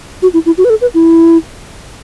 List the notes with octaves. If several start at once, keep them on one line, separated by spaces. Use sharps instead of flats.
F#4
E4
E4
F#4
B4
A4
B4
E4